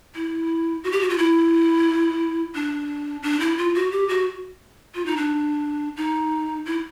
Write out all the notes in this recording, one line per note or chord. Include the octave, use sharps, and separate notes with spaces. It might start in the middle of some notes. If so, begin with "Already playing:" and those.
E4
F#4
G4
F#4
F4
E4
D4
D4
E4
F4
F#4
G4
F#4
F4
D#4
D4
D#4
E4